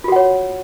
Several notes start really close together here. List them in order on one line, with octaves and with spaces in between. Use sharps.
F4 F#4 F#5 C#5